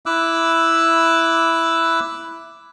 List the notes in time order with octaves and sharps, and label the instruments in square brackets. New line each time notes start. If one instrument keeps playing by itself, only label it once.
[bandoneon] E4 D6 E6 F#6